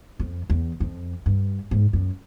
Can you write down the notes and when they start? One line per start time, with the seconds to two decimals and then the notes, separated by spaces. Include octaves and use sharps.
0.19 F2
0.50 E2
0.80 F2
1.26 G2
1.71 G#2
1.93 F#2